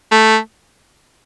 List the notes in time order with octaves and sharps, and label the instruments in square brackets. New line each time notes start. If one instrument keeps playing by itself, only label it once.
[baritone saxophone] A3